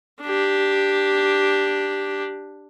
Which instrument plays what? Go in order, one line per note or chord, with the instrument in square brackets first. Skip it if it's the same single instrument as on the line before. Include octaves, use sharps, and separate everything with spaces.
[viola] D4 G4